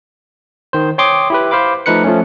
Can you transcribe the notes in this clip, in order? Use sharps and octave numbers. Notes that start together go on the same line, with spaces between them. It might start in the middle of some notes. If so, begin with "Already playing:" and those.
D#3 C5
C#5 G5 C6 D6 D#6
E4 G4 B4
C5 F5 B5 D6
F3 A3 D#4 B4 F#6 C#7
F3 A3 C#4